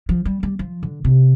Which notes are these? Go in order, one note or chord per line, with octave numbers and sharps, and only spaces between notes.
F3
G3
G3
F3
D3
C3